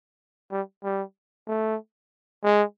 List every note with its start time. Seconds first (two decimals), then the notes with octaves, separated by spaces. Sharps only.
0.52 G3
0.83 G3
1.47 A3
2.44 G#3